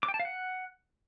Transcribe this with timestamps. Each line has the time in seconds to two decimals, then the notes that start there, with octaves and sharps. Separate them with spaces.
0.03 D6
0.08 G5
0.14 A5
0.20 F5
0.25 F#5